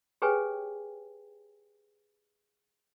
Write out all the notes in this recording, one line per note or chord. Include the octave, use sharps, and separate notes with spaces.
G4 G#4 B4 C#5 G5 G#5